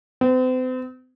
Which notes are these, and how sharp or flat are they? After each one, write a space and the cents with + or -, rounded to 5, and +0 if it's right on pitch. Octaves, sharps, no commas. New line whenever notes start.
C4 -40